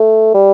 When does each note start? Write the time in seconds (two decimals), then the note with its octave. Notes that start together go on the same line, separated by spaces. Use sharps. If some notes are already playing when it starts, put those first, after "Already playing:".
Already playing: A3
0.34 G3